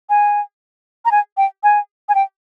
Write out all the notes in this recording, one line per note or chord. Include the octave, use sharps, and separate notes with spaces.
G#5
A#5
G#5
G5
G#5
G#5
G5